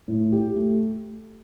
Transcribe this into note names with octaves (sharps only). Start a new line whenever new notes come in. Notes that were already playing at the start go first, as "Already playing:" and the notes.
A2
G4
A3